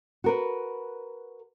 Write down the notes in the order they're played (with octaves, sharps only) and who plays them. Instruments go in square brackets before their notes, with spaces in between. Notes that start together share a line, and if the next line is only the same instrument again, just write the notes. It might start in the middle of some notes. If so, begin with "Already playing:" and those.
[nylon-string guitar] F#4 A#4 B4